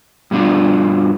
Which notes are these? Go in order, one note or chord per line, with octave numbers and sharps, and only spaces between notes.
G2 B2 G3 D4 F4